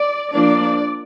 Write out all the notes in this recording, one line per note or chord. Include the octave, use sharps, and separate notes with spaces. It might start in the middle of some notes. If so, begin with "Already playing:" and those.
Already playing: D5
F3 A#3 D4 D5